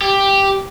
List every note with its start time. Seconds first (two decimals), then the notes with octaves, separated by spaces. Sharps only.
0.01 G4